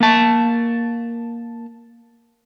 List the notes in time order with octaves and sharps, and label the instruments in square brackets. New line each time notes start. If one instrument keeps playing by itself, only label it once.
[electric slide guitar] A#3 A5